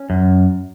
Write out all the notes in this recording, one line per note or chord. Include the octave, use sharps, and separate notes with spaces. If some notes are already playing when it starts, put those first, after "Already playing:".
Already playing: C#4
F#2